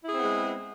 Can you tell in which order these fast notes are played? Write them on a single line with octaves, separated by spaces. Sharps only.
E4 G#4 C4 B3 G#3